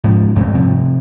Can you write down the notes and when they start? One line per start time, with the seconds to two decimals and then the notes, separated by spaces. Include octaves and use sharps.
0.04 G#2 F3
0.36 D2 G2 A3 C4
0.54 C3 F3